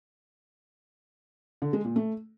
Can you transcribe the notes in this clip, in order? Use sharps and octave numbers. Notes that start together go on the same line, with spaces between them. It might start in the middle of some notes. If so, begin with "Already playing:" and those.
D3
G#3
A#2
A3